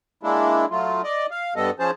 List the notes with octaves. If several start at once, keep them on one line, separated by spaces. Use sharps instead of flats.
G#3 A#3 D4 E4
F#3 A3 F4
D5 D#5
F5
G2 G3 B3 A4 D#5
F3 C#4 G#4 C5 A5